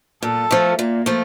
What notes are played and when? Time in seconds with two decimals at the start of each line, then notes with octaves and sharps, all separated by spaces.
0.22 A#2 A4
0.51 F3 A3
0.79 A#2 A#3
1.06 F3 A3